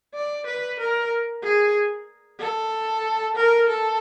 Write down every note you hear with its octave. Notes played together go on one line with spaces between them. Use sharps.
D5
B4
A#4
G#4
A4
A#4
A4